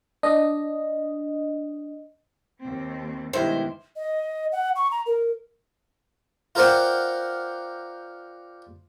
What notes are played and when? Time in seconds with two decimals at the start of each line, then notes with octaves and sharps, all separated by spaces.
0.23 D4 D#5
2.61 D#2 C4
3.33 G2 B2 D#3 G#3 E4 G4 C5
3.96 D#5
4.52 F#5
4.76 C#6
4.91 A#5
5.06 A#4
6.55 F4 A#4 C5 D5 F#5 G5